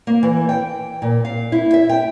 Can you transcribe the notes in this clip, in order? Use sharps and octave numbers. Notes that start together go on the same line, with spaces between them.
A#3
E3
G5
A#2
F5
E4
E5
G5